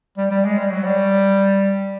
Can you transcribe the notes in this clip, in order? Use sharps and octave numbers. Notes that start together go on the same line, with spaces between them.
G3
G3
G#3
G3
F#3
G3